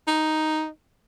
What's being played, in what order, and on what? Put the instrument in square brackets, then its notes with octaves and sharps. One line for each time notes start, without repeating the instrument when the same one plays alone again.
[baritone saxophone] D#4